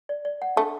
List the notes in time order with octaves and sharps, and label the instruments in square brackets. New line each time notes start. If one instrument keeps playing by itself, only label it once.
[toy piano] D5
D5
F#5
[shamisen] A3 [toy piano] D4